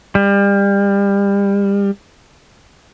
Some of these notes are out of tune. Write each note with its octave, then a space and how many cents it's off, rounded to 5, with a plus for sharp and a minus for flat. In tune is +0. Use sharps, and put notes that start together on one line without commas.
G3 +30